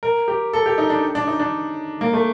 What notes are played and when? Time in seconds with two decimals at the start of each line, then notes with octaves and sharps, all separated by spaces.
0.03 A#4
0.28 G4
0.53 A4
0.66 G4
0.78 D#4
0.90 D4
1.15 D4
1.27 D#4
1.39 D4
2.01 A#3
2.13 A3